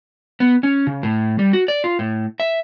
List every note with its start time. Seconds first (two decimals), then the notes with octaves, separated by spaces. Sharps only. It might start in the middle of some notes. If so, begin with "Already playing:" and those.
0.40 B3
0.63 C#4
0.87 C#3
1.03 A2
1.39 G3
1.53 F#4
1.68 D5
1.84 F4
1.99 A2
2.40 E5